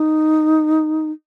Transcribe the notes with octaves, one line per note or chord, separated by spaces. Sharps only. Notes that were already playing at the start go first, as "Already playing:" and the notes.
Already playing: D#4